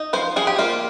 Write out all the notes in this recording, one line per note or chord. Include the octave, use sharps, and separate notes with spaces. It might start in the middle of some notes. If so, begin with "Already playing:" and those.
Already playing: D#4
F3 C5
F3 G#4
G4
A#3 F4